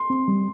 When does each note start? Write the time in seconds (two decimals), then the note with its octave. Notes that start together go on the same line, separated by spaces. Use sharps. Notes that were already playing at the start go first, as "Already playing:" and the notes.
Already playing: C6
0.10 C4
0.28 G3